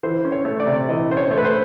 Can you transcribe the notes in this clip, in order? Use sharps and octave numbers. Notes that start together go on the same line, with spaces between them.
E3 C5
C#4
C#5
A3
D5
C3
E3 D#5
C#4 C5
C#5
A3
B4
C5